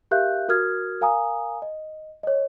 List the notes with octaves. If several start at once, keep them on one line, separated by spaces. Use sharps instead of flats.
G4 A#4 E5 F5 F#6 G6
F#4 A#4 D#6 F6 G#6
A#4 F5 G#5 A#5 D#6
D#5
C#5 D#5